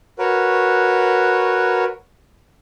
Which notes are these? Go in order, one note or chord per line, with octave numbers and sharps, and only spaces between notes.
F#4 A#4 B4 C#5